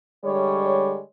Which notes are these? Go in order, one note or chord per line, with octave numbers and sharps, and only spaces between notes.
D3 G3 G#3 C#5